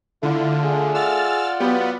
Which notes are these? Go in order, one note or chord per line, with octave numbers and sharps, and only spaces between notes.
D3 A3 E4 F4
G#4
F4 D5 F#5 E6 F6 A6
F#3 B3 G4